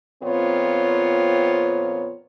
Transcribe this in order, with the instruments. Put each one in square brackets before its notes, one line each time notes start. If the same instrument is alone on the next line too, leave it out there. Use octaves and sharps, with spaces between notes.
[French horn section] F2 A#2 B3 C4 F4 C#5